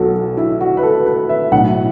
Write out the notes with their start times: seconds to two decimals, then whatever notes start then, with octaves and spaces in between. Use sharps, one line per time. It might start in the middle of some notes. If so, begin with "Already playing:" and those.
Already playing: B1 B2 F#3 F#4 A4
0.37 E4
0.61 F#4
0.77 B4
0.83 A4
1.06 B4
1.29 E5
1.52 B1 A2 F#3 F#5